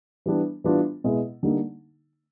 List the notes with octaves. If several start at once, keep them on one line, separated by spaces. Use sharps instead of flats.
E3 G3 B3 D4
E3 G3 B3 D4 F4
B2 G#3 B3 E4
D3 G3 A#3 D#4